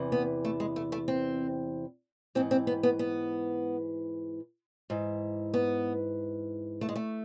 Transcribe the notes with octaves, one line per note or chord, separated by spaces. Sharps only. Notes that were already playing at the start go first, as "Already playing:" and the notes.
Already playing: E2 C3 E3
B3
A3
G#3
A3
A3
C4
G#2 E3 C4
C4
B3
B3
B3
G#2 E3
B3
A3
G#3
A3